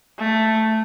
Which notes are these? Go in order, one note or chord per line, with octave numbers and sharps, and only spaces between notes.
A3